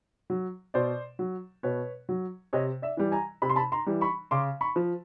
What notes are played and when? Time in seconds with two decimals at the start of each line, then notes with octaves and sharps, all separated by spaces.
0.30 F#3
0.74 B2 C5 D5
1.19 F#3
1.63 B2 B4 C#5
2.09 F#3
2.53 C3 C#5 D#5
2.82 D5 E5
2.97 E3 G3
3.12 G#5 A#5
3.42 C3 B5
3.50 C6
3.56 A5 B5
3.72 A#5 C6
3.86 E3 G3
4.01 B5 C#6
4.31 C#3 C6 D6
4.61 B5 C#6
4.76 F3